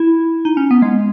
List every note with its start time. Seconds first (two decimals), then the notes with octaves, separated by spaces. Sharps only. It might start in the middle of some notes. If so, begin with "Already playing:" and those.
Already playing: E4
0.45 D#4
0.57 C#4
0.71 B3
0.82 G#3